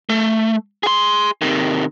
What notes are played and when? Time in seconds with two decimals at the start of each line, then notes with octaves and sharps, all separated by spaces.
0.10 A3
0.83 G#4 C6
1.42 C3 D#3